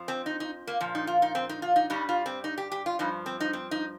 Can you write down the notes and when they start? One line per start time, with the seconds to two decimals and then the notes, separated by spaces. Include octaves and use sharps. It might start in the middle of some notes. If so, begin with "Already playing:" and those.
Already playing: F2 F3
0.08 C4
0.26 D#4
0.40 D#4
0.67 A#3
0.81 A#2 F3
0.95 D#4
1.07 F4
1.22 D#4
1.35 C4
1.49 D#4
1.62 F4
1.76 D#4
1.90 G2 G3 D#4
2.09 F4
2.26 C4
2.44 D#4
2.58 G4
2.72 G4
2.86 F4
2.99 G2 F3 D#4
3.26 C4
3.40 D#4
3.53 C4
3.71 D#4